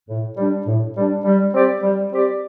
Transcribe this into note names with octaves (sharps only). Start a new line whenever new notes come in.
A2
G3 D4
A2
G3 D4
G3
C4 G4 D5
G3
C4 G4 D5